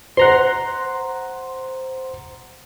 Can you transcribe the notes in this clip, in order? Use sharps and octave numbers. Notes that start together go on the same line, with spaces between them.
C5 F#5 A#5 C6